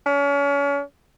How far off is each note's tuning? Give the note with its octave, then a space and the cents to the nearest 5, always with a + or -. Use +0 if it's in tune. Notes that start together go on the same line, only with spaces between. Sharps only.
C#4 +35